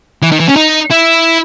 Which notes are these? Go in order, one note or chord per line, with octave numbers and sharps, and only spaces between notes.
E3
D#3
E3
C#4
D#4
E4